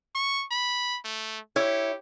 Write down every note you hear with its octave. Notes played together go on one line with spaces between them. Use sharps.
C#6
B5
A3
E4 G4 C#5